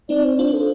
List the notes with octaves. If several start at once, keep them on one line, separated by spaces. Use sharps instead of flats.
C4 D#4 D5
C5
D4 F4 C5
A4